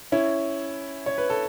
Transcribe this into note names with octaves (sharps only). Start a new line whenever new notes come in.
C#4 E4
C#5
B4
A4